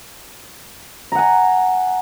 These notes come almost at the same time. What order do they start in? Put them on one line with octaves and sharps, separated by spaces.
A#5 F#5 G#5